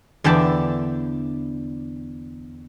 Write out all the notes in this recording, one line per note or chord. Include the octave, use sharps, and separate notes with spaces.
E2 D3 E5 G5 A5 B5